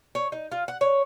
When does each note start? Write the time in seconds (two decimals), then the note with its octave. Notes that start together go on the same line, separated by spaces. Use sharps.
0.15 C#5
0.32 D#4
0.52 F4
0.68 F#5
0.81 C#5